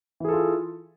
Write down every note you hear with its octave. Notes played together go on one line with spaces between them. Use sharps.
E3 F4 G#4 A4